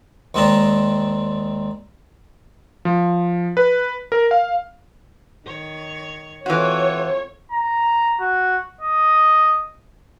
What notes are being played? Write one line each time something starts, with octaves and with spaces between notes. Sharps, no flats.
D#2 G#3 C4 D4 A5 A#5
F3
B4
A#4
F5
D#3 C#5
E3 C4 F4 F#4 A4 C#5
A#5
F#4
D#5